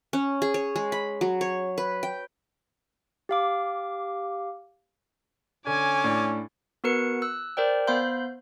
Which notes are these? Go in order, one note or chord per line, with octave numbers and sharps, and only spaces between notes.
C#4
G#4
C#5
G#3
B5
F#3
C#5
B4
G5
G4 F5 D6
D3 C#4 G#5 D6
A2 D4
B3 F#4 A#4 B4 C#7
E6 F#6
A#4 C5 D5 G5
B3 C5 F5 B5 C6 G6